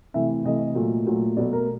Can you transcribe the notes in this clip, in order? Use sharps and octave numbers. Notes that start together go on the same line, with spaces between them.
C3 E3 A3 E5
C3 E3 A3 D#5
A#2 F#3 A3
A#2 F#3 A3
B2 F#3 A3 D5
A#4